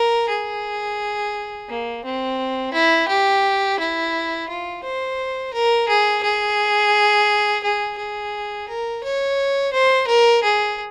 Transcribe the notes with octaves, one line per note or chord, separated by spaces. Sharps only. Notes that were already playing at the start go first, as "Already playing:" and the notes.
Already playing: A#4
G#4
A#3
C4
E4
G4
E4
F4
C5
A#4
G#4
G#4
G#4
G#4
A#4
C#5
C5
A#4
G#4